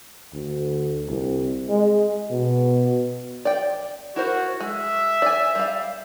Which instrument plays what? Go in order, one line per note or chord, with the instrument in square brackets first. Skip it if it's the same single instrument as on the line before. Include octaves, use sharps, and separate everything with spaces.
[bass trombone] D2
C2
G#3
B2
[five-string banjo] D5 G5
[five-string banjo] E4 A#4 C5 [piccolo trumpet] F#4
[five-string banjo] G#3 [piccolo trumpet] E5
[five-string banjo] D5 G#5
G3 F5